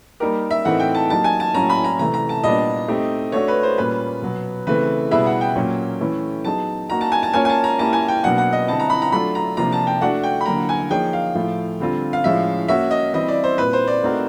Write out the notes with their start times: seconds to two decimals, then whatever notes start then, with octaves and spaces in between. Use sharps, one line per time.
0.20 G3 A#3 D#4 G4 A#4
0.51 E5
0.65 A2 E3 A3 C4 D#4 F#5
0.80 G5
0.95 A5
1.10 F#3 A#3 D#4 G4 A5
1.24 G#5
1.40 A5
1.54 A2 F#3 A#3 C#4 A#5
1.70 B5
1.84 A#5
1.99 C3 E3 A3 A#5
2.14 A#5
2.29 A5
2.44 A#2 G3 B3 D4 D#5
2.88 A3 C4 D#4 G4
3.32 A3 D4 F#4 A4 C#5
3.48 B4
3.63 C5
3.77 A#2 G3 A#3 C#4 F4 B4
4.22 B2 F#3 B3
4.67 C#3 E3 A3 C4 B4
5.11 B2 G3 B3 E4 G#4 E5
5.26 F#5
5.41 G5
5.56 A#2 F#3 A#3 C#4
6.00 E3 A3 C#4 E4 A4
6.44 F#3 B3 D#4 G#4 A5
6.89 A#3 D#4 F#4 A#5
7.01 A5
7.12 G#5
7.23 A5
7.33 A#3 C#4 F4 A#4 C#5 G#5
7.45 G#5
7.49 A5
7.64 A#5
7.78 A#3 C#4 E4 G4 A5
7.93 G#5
8.08 G5
8.23 B2 F#3 A#3 D4 F#5
8.38 F#5
8.53 D#5
8.68 D3 G3 C4 E4 A5
8.80 A#5
8.90 B5
9.02 A#5
9.12 F#3 A3 D4 F4 A4 B5
9.35 A#5
9.57 C3 F3 A#3 D4 F4 A#5
9.72 A5
9.87 G5
10.01 A3 D4 F#4 F#5
10.23 G5
10.41 B5
10.46 D3 F#3 A#3 A#5
10.69 G#5
10.91 F3 A#3 D#4 G#4 C#5 G5
11.13 F5
11.35 A2 F3 A3
11.80 D3 G3 C4 F4 A4
12.13 F5
12.24 A2 F3 G#3 C#4 E5
12.68 A#3 C#4 F#4 E5
12.91 D#5
13.13 E3 G3 C4 E4 D#5
13.28 D5
13.44 C5
13.58 A#2 G3 C4 E4 B4
13.73 C5
13.88 D5
14.03 A3 C4 D#4 F#4 A#4